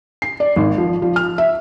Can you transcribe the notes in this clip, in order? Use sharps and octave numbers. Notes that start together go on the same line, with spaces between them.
C7
D5
G#1
F3
F3
F6
E5